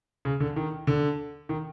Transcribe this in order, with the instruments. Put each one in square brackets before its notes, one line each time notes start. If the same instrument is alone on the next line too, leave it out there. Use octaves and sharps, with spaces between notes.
[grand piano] C#3
D3
D#3
D3
D#3